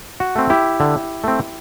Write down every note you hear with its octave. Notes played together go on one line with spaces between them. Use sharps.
F#4
A3 C4
E4 G4
D3
A3 C4